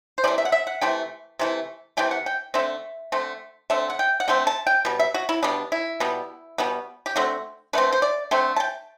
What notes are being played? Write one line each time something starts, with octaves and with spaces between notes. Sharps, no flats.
C5
C3 E3 A3 D5
E5
F#5
E5
F#5
C3 E3 A3 G5
C3 E3 A3
C3 E3 A3 G5
F#5
G5
D3 A3 C4 E5
D3 A3 C4
D3 A3 C4 E5
F#5
G5
F#5
D3 A3 C4 G5
A5
G5
B2 G3
E5
F#4
E4
B2 G3 B3 D4
E4
B2 G3 B3
B2 G3 B3
G4
D3 A3 C4 F#4
D3 A3 C4 B4
C5
D5
D3 A3 C4 G5
A5
G5